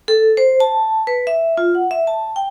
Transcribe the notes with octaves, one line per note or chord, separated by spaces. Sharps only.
A4
C5
A5
B4
E5
F4
F#5
E5
A5
G5